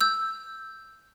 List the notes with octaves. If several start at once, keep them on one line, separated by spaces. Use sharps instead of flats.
E6 G6